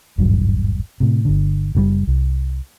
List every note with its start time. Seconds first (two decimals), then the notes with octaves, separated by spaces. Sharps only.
0.18 D#1 G#1 G2 F#3
1.00 A2 C3
1.25 G1 D3
1.75 F#1 C3 G3
2.07 C2